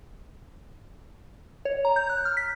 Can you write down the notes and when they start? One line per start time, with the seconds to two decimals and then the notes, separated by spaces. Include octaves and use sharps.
1.65 C#5
1.85 A#5
1.96 G6
2.10 F#6
2.25 F6
2.37 B6